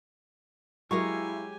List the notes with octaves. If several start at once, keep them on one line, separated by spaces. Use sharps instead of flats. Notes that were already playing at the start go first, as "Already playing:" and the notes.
F#3 G#3 E4 G4 A#4 F5 G#5 C#6